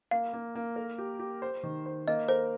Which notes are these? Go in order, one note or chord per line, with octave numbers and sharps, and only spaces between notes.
A#3 F5
A#3
A#3
A#4
G4
G4
C5
D#3
C5
A#3 D#5
A#4 C5